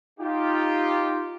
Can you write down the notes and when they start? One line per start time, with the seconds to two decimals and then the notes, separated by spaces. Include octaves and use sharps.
0.19 D#4 F4 G4